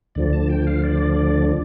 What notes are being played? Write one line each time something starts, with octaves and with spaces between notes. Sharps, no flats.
D2 D3 F3 D5
A5
G5
F5
D5